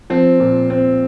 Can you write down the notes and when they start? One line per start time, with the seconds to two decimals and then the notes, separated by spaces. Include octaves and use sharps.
0.10 F3 C4 C5
0.40 A#2
0.70 C4